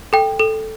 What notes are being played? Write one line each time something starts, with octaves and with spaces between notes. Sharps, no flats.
A4 G5
A4